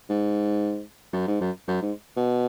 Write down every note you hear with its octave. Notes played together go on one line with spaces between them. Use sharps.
G#2
F#2
G#2
F#2
F#2
G#2
B2